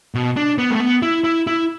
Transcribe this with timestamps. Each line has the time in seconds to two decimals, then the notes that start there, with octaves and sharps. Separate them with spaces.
0.15 B2
0.37 D4
0.58 B3
0.70 A3
0.80 B3
1.02 E4
1.24 E4
1.47 E4